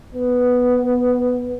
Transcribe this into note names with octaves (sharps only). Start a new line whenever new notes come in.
B3